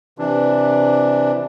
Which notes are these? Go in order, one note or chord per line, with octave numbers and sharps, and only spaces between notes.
C3 E3 D4